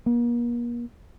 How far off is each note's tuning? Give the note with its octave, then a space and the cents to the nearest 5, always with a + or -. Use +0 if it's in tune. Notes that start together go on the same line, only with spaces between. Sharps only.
A#3 +40